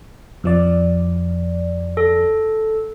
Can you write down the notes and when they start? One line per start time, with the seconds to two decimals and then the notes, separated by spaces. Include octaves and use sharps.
0.44 F2 F3 D5
1.97 A4